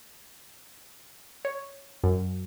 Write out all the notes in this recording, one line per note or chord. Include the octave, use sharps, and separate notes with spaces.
C#5
F#2